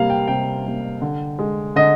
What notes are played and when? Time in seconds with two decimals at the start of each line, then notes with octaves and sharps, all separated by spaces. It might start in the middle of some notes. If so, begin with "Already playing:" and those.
Already playing: C3 G3 A#3 F5
0.10 G5
0.28 C3 G5
0.65 G3 A#3
1.02 D3
1.39 G#3
1.76 D3 D#5